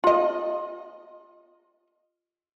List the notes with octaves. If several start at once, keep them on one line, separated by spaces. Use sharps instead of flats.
F4 D#5